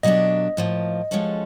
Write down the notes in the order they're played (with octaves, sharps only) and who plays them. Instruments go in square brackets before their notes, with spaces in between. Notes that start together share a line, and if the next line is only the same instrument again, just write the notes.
[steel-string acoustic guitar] B2 F#3 A#3 D4 G4 [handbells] D#5
[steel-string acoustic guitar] A2 F3 A#3
F3 G#3 C#4 F#4 A4